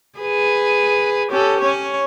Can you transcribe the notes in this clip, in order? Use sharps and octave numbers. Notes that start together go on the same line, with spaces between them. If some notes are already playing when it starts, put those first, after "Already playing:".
G#4 B4
C#4 G4 A4
C#4 C#5